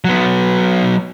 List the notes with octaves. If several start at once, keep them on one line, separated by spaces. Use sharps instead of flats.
F#3 B3